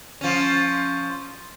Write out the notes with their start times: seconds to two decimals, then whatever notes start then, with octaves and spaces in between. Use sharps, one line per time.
0.21 F3 C#4